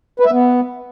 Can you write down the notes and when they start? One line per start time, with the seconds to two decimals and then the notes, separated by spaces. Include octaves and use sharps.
0.20 B4
0.25 E5
0.31 B3